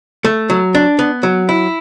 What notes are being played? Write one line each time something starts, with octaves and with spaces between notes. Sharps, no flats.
A3
F#3
D4
B3
F#3
E4